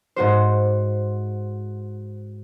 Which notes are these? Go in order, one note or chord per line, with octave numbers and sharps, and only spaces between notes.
G#2 F#4 C5